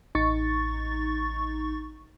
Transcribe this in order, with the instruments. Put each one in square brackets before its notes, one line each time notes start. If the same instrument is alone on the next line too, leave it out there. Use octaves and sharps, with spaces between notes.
[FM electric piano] A1 D#4 C#6 A6